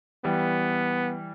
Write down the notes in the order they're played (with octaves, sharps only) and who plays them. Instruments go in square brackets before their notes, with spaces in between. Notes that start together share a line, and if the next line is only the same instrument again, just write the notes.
[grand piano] E3 G3 [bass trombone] B3